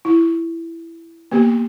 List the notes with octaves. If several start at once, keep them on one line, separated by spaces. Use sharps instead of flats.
E4
A#3 B3 G4